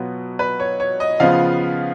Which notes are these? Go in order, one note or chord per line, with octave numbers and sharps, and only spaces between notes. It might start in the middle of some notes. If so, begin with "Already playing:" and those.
Already playing: B2 F#3 B3 F4
B4
C#5
C#5
D#5
C#3 F3 B3 F4 F5